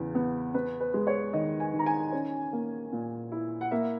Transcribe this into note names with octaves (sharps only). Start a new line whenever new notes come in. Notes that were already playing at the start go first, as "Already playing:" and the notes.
Already playing: E2 C#3
B3
B3 B4
B4
G#3
C#5
D#3 D#5
G#5
D#3
A#5
G#5
C#4
A#3
A#2
E4
F#5
A#3 E5